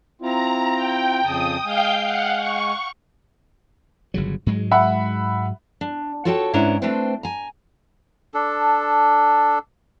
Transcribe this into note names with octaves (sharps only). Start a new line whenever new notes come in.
C4 E4 F4 A#5
G5
F2 C#3 A5 D#6
G#3 F5 G5 G#5 G6
F5 F#5
C#6
G1 C#3 F#3
G#2 F#3 G#3
E5 F#5 B5
D4
F4 F#4 A4 C#5 G5 A5
G#2 B3 C#4 D4 E4 A#5
A3 C4 D4 B4 C5 G5
G#5 A#5
D4 A4